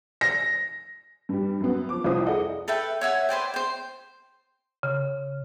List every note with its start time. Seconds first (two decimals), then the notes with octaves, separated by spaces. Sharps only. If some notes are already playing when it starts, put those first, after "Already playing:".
0.21 A#6
1.29 G2 G3
1.61 F#2 B3
1.89 F3 D6
2.04 C2 F2 F4 C5 D#6
2.26 E4 G#4 A4 D5 D#5 F#5
2.68 A4 B4 E5 G5
3.01 C#5 E5 F#5 G#5
3.29 B4 C5 D5 G5
3.54 C5 G5
4.83 C#3